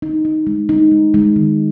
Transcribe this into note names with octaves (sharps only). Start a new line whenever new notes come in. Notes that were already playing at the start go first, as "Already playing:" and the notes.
D#4
D#4
G#3
D#4
G#3
G#3
D#3